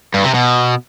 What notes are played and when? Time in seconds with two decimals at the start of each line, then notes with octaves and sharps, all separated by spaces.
0.14 G2
0.24 C3
0.34 B2